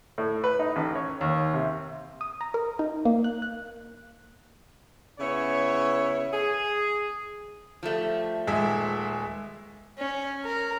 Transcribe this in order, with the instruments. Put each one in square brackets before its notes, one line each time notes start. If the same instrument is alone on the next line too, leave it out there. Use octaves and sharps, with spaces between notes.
[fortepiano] A2
B4
D#4
A1
C#5
D#2
C3
[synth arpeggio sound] D#6
A#5
A#4
D#4
A#3
F#6
F#6
[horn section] C#3 B3 E4 C#5
G#4
[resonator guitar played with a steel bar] F3 G3 A3
[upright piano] D#1 G#3 E5
[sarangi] C#4
A#4